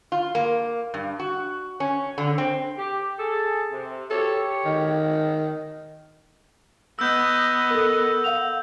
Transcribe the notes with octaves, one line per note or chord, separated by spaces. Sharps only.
F4
A#3
G2
F#4
C#4
D3
C4
G4
G#4 A4
C3
G4 A4 C#5
D#3
B3 D#5 E6 G6
A4 A#4
F5 F#5 F7